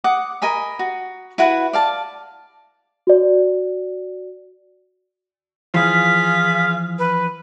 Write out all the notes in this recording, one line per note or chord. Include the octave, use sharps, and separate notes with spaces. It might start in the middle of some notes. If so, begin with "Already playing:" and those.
F#5 D6 D#6
A#4 D#5 G#5 B5
F#4
E4 F#4 B4 F#5
D5 F5 A5
F#4 D5
E3 F3 F4 G#4 F5 B6
B4